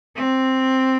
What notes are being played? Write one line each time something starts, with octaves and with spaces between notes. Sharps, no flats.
C4